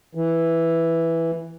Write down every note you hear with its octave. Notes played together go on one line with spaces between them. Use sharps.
E3